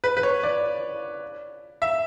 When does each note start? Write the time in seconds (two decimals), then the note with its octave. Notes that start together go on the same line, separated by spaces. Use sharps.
0.04 B4
0.17 B4
0.23 C#5
0.43 D5
1.82 E5